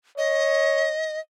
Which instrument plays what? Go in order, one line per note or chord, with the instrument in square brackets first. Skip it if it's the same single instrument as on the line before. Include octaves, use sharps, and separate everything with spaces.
[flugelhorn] C#5 [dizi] D#5